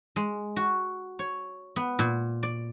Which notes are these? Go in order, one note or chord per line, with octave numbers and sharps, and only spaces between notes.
G#3
F#4
C#5
B3
A#2
D5